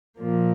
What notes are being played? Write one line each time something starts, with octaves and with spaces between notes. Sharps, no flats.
A#2 F3 A#3